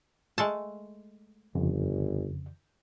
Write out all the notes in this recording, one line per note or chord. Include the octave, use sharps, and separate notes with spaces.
G#3 A3 A5
G1 F2 C#3